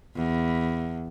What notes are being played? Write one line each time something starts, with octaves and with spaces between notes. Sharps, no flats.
E2